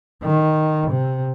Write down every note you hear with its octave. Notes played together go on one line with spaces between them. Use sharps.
D#3
C3